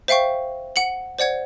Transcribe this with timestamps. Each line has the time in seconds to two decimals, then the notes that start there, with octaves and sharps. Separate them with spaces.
0.08 C5 E5 F5 G5 C#6
0.76 F#5 C#7 F#7
1.19 C5 D5 F#5 G#6